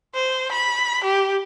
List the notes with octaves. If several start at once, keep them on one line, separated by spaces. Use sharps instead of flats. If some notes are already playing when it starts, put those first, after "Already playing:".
C5
B5
G4